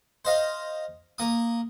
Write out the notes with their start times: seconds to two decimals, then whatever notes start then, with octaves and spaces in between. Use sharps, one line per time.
0.25 C5 D#5 F5
1.18 A#3 D#6